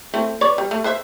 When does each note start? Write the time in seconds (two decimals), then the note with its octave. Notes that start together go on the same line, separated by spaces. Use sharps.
0.14 A3 C4 E4
0.41 B4 C#5 D5
0.58 G3
0.71 A3
0.84 B4 C5 E5